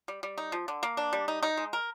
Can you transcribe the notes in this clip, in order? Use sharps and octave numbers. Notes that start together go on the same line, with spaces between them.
G3
G3
D#4
F3
D3
A#3
D4
G3
D#4
D#4
G#3
A#4